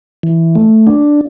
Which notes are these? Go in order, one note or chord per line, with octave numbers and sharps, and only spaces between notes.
E3
A3
D4